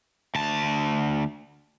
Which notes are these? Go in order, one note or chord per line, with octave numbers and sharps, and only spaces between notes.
D2 A5